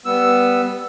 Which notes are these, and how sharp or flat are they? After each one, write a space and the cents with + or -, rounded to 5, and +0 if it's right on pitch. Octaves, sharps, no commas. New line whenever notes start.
G3 +0 B3 +0 E6 +5